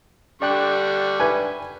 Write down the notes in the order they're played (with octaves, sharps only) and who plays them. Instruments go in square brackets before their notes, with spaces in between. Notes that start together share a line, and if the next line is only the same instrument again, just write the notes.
[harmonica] D3 G3 C#6 [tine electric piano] D5 G5 F#6
[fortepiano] B4 G#5